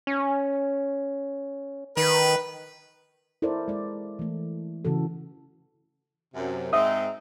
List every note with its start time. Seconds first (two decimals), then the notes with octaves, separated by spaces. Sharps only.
0.07 C#4
1.97 D#3 B4
3.42 E4 A4 A#4 C5 D5
3.68 G#3 D5
4.19 E3 A3
4.85 C#3 E3 F#4 A4
6.35 F#2 C3
6.73 G#2 C4 D#4 E5 D#6